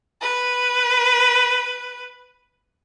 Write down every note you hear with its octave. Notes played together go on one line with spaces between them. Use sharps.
B4